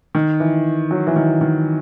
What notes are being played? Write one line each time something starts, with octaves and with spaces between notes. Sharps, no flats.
D#3
E3
F#3
E3
D#3
D#3